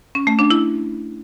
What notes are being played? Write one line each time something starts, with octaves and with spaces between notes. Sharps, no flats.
C#4
A3
D4
E4